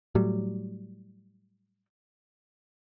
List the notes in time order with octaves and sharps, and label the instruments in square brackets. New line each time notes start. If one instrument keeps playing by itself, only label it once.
[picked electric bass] A2 F#3 G3